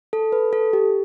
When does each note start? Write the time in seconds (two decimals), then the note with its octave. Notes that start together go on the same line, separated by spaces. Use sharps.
0.13 A4
0.32 B4
0.53 A4
0.73 G4